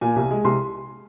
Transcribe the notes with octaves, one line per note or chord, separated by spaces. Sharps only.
A#2 G#5
C2
G#3
C2 C6